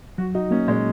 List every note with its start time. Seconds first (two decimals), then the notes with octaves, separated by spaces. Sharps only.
0.18 F#3 F#4
0.35 D#4 F#4
0.51 A#3 C#4
0.68 A#2 G#3